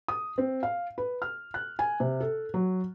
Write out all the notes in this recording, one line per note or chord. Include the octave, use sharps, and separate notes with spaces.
D#6
C4
F5
B4
F6
F#6
G#5
C3
A4
F#3